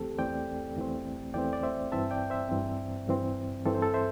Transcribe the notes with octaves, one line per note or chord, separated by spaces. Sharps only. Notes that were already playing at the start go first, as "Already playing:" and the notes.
Already playing: E2 E3 A3 C4 G4 A4
E2 E3 A3 C4 D5 G5
E2 E3 A3 C4
E2 E3 A3 C4 D5 G5
D5
C5 E5
G2 E3 C4 E5 A5
D5 G5
C5 E5
G2 E3 C4
G2 E3 C4
G2 E3 C4 A4
C5
A4
C5 E5